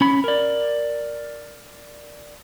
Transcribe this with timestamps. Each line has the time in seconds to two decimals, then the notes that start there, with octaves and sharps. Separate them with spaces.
0.01 C#4 B5
0.24 A#4 D5